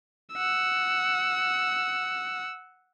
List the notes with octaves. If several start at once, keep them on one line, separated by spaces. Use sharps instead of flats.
F#5 E6